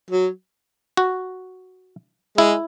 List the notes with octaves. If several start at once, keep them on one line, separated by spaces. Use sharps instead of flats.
F#3
F#4
G#3 E4